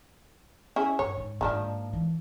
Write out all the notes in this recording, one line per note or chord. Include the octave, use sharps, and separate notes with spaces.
C#4 E4 G#4
G2 C#5
G#2
G#2 D#3 F3 A#3 D4
E3